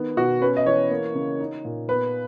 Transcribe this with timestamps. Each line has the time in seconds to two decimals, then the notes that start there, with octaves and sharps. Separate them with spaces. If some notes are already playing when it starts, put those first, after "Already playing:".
Already playing: D#3 B3
0.17 B2 F#4
0.42 C#4 B4
0.57 D#5
0.66 E3 C#5
0.91 A#3
1.15 C#3
1.40 D#4
1.65 A#2
1.89 B3 B4